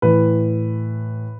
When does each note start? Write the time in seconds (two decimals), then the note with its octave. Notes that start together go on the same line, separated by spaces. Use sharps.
0.02 A2 E3 B4